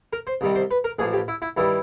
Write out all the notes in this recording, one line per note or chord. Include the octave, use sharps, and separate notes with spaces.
A#4
C5
C2 C3 D#3 G3
C5
B4
A#4
A1 A2 F3 G#4
G4
E4
E4
G2 D#3 G3 E4